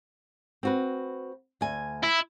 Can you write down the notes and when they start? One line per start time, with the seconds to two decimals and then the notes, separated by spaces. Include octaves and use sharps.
0.63 C4 F#4 B4
1.61 D2 G#5
2.03 E4